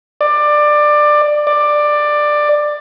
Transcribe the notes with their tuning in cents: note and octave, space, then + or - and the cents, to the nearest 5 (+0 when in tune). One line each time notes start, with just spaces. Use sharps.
D5 +20
D5 +15